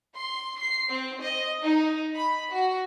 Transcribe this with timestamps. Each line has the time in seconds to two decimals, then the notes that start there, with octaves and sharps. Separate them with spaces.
0.17 C6
0.59 C7
0.89 C4
1.22 D#5
1.61 D#4
2.15 B5
2.52 F#4